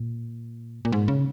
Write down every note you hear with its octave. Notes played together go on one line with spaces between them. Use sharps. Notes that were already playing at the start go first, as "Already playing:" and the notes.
Already playing: A#2
A#2
G#2
C#3